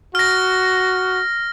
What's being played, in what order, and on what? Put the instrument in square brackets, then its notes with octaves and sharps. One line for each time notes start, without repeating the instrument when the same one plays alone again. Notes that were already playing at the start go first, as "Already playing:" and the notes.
[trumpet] F#4 [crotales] F6 A#6